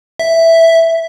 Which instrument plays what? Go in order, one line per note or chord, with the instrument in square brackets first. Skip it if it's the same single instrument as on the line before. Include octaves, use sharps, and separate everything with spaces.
[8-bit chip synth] E5